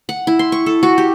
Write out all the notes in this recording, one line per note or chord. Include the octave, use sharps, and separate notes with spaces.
F#5
E4
C6
C#6
A4
F#4
G4